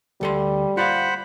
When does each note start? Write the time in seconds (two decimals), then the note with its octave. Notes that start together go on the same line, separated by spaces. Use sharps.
0.21 D2 G3 A4 C6
0.77 F4 C5 D5 F5 F#5 B5